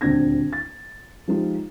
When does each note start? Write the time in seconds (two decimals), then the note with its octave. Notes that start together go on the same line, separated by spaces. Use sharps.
0.01 D#1 D2 C4 D4 G#6 A#6
0.53 A6
1.28 F3 G#3 D#4 F4 G4